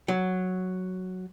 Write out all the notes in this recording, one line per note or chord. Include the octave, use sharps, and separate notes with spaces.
F#3